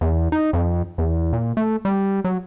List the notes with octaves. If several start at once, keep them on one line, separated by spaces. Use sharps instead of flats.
E2
D#4
F2
E2
A#2
A3
G3
F#3